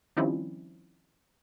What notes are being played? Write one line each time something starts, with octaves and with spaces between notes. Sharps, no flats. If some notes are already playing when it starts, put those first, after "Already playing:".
D#3 F3 G3 C4 C#4 E4